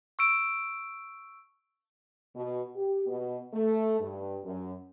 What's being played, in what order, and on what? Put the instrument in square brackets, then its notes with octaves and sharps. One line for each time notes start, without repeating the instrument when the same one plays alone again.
[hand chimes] C#6 E6 D7
[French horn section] B2
G4
B2
A3
G2
F#2